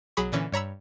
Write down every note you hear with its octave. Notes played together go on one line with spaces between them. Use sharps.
B1 F#3 G#4 B5 C#6
A#2 D3 E3 C#4
G2 C#5 A#5 B5 E6